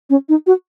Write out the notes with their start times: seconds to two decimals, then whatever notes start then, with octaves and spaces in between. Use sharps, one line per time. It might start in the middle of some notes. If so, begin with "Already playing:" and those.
0.10 C#4
0.29 D#4
0.47 F#4